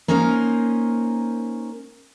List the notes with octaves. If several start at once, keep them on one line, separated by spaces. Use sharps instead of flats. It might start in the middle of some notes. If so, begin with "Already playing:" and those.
A#3 C#4 D#4 A#4 C5